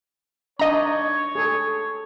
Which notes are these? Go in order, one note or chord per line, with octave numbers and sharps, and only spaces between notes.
D4 D#4 C#5 D#5 A#5
G#4 A4